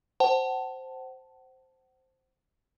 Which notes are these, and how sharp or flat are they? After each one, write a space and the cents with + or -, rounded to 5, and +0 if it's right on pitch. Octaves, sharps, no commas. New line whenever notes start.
C5 +0 F#5 +35 A5 +0